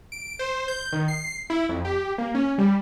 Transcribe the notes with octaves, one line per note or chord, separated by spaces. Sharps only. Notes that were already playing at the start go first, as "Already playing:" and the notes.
D7
C5
G6
D#3
C7
E4
F2
G4
A#3
C#4
G3